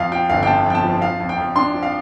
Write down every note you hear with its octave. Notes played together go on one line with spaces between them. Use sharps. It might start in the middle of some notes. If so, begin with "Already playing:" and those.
Already playing: F2 F5
F3 G5
G1 F5
G5
C3 A5
F2 G5
A5
F3
F3 F5
F2
G5
F2
D4 C6
F3
F5